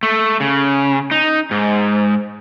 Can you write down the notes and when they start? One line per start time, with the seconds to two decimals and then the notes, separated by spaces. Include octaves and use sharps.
0.03 A3
0.40 C#3
1.11 D#4
1.51 G#2